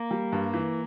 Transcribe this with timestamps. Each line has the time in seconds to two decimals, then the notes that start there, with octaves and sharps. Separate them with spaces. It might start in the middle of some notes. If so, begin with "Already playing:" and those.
Already playing: A#3
0.11 G3
0.32 G2
0.54 E3